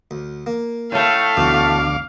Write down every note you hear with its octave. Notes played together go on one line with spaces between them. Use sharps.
D2
A#3
A2 A3 F5
D2 B2 E3 D6